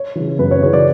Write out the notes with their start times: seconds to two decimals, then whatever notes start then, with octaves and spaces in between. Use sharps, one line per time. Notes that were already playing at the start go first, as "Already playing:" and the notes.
Already playing: C#5
0.16 C#3 E3
0.39 F#2 B4
0.51 C#5
0.63 C#3 E3 C#5
0.73 D5